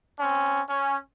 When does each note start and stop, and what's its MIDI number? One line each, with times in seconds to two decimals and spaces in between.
0.18 0.59 60
0.18 0.59 61
0.68 0.96 61